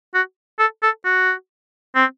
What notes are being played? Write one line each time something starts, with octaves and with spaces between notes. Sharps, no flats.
F#4
A4
A4
F#4
C4